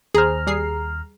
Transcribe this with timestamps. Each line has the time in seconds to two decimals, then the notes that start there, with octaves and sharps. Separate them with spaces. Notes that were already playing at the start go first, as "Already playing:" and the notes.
0.14 D#2 G#4 C5 A#5 F6
0.47 G3 G#4 C7